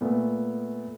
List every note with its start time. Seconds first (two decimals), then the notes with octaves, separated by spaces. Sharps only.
0.01 A#2 A3 B3